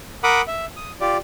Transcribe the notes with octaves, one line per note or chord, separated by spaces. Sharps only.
A#4 F#5 B5 D6 D#6
E5
D#6
F4 G4 D5